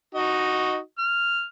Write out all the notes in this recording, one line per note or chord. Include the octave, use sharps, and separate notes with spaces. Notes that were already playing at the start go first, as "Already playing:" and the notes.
D#4 F#4 D#5
F6